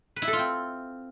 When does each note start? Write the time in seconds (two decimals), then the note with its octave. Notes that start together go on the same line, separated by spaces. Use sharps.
0.16 B4
0.22 E4
0.27 A4
0.33 F4
0.39 C4